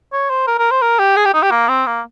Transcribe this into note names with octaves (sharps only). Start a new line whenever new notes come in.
C#5
C5
A#4
A#4
C5
A#4
G4
G#4
G4
D#4
G4
A#3
C4
A#3